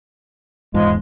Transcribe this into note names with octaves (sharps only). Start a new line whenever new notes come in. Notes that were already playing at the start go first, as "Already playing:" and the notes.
D#1 E2 G#2 F3 G#3